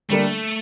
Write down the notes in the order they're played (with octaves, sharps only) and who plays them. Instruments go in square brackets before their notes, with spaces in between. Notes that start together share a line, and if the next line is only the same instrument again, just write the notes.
[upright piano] D3 G3 A#3 D4 [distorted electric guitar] A3